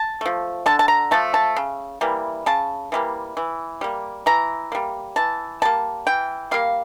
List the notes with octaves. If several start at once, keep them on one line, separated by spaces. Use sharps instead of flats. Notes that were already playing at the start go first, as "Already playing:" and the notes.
Already playing: A5
F3 A3
D3 A5
A5
A#5
F3 A3 A5
A5
C#3
E3 G3 A#3
C#3 A5
E3 G3 A#3
E3
G3 A#3
E3 A#5
G3 A#3
E3 A5
G3 A#3 A5
E3 G5
G3 A#3 F5